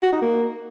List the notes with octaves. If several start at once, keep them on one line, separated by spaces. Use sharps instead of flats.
F#4
D#4
A#3